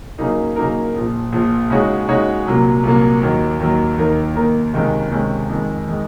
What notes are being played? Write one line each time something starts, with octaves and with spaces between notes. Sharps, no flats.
C#3 F#3 A#3 D#4 A#4
C#3 F#3 A#3 D#4 A#4
A#1 A#2 F3
A#1 A#2 F3
C#3 G#3 D#4 F#4 C#5
C#3 G#3 D#4 F#4 C#5
C2 A#2 F#3 A#3
C2 A#2 F#3 A#3
D#2 D#3 F#3
D#2 D#3 F#3
D#2 D#3 A#3 D#4 A#4
D#2 D#3 A#3 D#4 A#4
C#2 C3 D#3 G#3 C#4
C#2 C3 D#3 G#3 C#4
F2 D#3 G#3
D#3 G#3